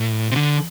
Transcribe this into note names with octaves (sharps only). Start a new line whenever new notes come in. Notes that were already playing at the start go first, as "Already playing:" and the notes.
Already playing: A2
C3
D3